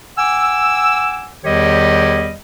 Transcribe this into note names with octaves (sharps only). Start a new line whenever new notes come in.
F#5 G#5 D6 E6
E2 D#3 G3 G4 C#5 D#5